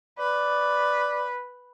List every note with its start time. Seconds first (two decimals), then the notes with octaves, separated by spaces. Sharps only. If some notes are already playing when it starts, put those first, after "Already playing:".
0.19 B4 D5